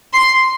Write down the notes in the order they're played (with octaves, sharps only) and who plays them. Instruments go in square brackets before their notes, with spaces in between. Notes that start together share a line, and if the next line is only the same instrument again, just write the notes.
[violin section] C6